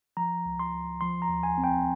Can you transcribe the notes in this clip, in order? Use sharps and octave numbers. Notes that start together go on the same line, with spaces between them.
F3 A#5
C#2
C6
C#2
F3 C6
A#5
D#2
G#5
C4
G5